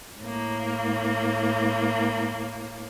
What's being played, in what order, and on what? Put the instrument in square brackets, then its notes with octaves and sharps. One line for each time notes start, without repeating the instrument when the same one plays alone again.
[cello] A2 A#3